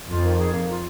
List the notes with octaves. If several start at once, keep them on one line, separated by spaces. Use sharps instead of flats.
F2 F4
D#3
G#4
A#3
F4